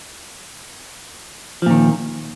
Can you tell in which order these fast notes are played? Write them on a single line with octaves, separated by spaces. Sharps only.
F3 A#2 D#3